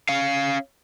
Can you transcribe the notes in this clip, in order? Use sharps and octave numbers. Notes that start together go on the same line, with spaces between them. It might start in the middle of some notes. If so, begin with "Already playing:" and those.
C#4 F5